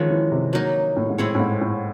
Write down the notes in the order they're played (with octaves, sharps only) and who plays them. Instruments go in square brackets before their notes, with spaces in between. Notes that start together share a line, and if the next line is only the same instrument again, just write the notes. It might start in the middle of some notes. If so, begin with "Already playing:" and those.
Already playing: [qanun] D#3 G#3 C#4 F#4 [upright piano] F3 F#3
[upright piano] E3
C3
[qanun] F#3 A#3 D#4
[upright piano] A2
G#2
[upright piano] A2 [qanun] C4 E4 G#4 C#5
[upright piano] A2
G#2
A2